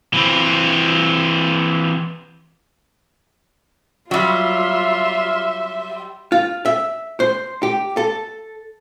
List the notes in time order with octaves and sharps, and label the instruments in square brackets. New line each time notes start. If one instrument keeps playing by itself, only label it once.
[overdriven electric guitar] E3 C4
[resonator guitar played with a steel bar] F#3 G3 [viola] F4 [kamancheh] E5 C6
[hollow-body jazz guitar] F4
E5
C5
G4
A4